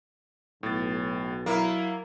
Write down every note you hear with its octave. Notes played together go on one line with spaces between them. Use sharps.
B1 A2 A6
F#3 A#3 E4